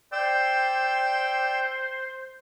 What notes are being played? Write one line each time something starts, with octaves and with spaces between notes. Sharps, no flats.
C5 D5 G5 E6